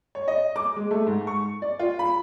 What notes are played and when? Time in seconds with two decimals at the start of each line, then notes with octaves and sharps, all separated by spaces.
0.15 C#5
0.28 D#5
0.56 D6
0.76 G#3
0.91 A3
1.07 G#2
1.27 C#6
1.62 D5
1.79 F4
1.99 B5